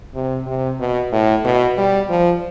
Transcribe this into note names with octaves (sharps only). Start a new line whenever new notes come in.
C3
C3
B2
A2
B2
G3
F3